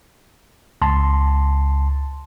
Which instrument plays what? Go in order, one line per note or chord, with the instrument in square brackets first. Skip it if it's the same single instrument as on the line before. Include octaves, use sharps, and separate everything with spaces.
[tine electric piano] C#2 A5 C6